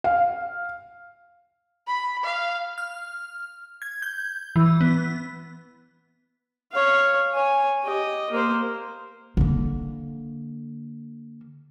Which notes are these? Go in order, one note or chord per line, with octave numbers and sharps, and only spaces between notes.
F5
B5
F5
F6
G#6
G6
E3
B3
C#5 F5
C#5 G#5
G4 D#5
A#3 C5
D3 A#3